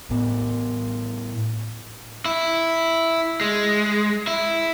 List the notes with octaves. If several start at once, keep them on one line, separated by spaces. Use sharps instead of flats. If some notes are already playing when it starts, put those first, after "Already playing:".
A2 B3
E4
G#3
E4